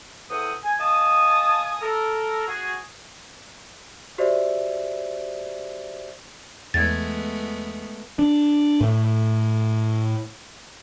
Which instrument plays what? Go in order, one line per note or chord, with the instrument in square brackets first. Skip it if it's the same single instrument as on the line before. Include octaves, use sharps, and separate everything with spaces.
[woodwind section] E2 A2 C4 F#5 D#6
G#5
D#5 F5 G#5 A5 D#6
A4 A#4
F#4 G#4
[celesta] F#4 G4 C5 D5 E5
[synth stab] E2 [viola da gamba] G#3 A3 B3 [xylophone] G#6 A6
[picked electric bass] D4
A2